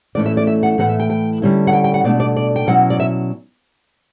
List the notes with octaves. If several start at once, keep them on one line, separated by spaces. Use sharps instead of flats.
A2 E3 A3 C#4 E4 D5
E5
D5
E5
F#5
A2 E3 A3 E4 F#5
E5
G5
G5
D3 G3 C#4 E4
F#5
G5
G5
F#5
B2 A3 D4 D5
D5
D5
G5
B2 F#3 C#4 E4 F#5
D5
E5